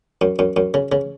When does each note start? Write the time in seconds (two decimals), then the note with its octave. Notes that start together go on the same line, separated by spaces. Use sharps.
0.21 F#2
0.39 F#2
0.56 F#2
0.74 C#3
0.92 C#3